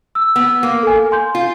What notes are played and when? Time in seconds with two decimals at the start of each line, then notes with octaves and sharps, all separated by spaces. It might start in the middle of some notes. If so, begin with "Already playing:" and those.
0.15 E6
0.36 B3
0.63 A#3
0.83 A4 G#5
1.11 G#5 C6 G6
1.35 F4